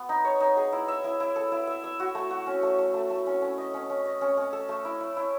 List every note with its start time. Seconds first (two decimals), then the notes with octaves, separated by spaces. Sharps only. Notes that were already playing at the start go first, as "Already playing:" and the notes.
Already playing: B3
0.09 D#4
0.25 C#5
0.40 D#4
0.57 G#4
0.73 E4
0.88 E5
1.04 E4
1.20 E4
1.36 A4
1.52 E4
1.67 E5
1.84 E5
2.00 F#4
2.15 A3
2.31 F#4
2.47 C#4
2.63 A3
2.78 A3
2.94 A3
3.10 A3
3.26 C#4
3.42 C#4
3.58 D#5
3.74 C#4
3.90 C#4
4.06 D#5
4.21 C#4
4.37 C#4
4.53 A4
4.69 A3
4.85 E4
5.00 E4
5.17 E4